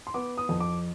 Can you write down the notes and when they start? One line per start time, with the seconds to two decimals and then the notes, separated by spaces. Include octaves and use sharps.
0.07 C6
0.14 B3 D6
0.38 D#6
0.49 F2
0.60 D6